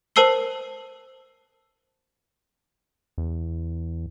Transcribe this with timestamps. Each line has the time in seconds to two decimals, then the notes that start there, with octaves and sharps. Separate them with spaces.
0.16 A#4 C5 A5 E6 C7 G7
3.18 E2